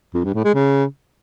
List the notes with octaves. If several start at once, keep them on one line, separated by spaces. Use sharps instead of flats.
F2
G2
A2
G#3
C#3